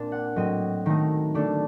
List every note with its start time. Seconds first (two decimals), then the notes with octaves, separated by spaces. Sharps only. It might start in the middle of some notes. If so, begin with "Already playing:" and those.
Already playing: A#2 C4 D4
0.12 F#5
0.36 A2 F#3 C4 D#5
0.86 D#3 A3 D#4
1.34 D3 A3 D4 D5